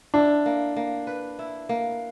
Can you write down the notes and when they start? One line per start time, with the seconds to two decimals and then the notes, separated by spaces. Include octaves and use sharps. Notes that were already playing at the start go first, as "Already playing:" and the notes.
0.14 D4 E4
0.46 A#3
0.76 A#3
1.07 B4
1.39 E4
1.69 A#3